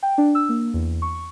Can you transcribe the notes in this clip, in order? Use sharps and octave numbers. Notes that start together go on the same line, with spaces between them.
G5
D4
E6
A#3
E2
C#6